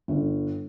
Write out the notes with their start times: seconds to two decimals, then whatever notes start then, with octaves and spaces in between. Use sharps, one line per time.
0.08 G1